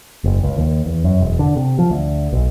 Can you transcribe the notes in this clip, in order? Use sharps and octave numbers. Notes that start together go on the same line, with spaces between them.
F#1
C#2
D#2
E2
F#2
E1
D3
C3
F3
D2
B1